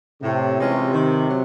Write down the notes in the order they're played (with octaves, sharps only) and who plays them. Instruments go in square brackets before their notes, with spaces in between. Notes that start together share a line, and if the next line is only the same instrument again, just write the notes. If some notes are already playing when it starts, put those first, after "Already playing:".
[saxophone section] A2 [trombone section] C3
[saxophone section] E3 G#3 C#4 F4
D#3
F#3